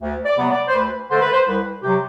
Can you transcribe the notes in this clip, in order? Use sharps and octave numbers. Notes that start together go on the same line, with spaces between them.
D2
D5
C3 F#3 B3
D5
C5
D2 B4
D3 A3 C5
B4
C5
C2 B4
C3 F#3 G4